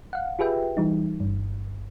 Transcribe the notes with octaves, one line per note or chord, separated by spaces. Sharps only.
F5 F#5
F4 G4 G#4 B4 E5 G5
E3 G3 D#4
G1 G2